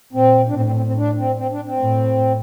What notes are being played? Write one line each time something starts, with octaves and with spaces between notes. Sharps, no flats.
A#2 C4
D4
A2 C4
C4
C4
C4
D4
C4
C4
D4
C4
A2